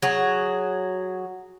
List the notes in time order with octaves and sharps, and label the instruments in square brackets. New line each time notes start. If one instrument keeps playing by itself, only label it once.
[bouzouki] F#3 G#4